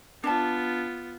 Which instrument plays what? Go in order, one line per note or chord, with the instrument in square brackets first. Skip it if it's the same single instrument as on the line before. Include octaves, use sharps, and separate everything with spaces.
[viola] B3 F4 [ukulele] D4 A5